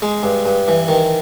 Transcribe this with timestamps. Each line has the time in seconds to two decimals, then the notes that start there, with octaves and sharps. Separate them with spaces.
0.02 G#3
0.23 G2
0.46 G2
0.68 E3
0.88 D#3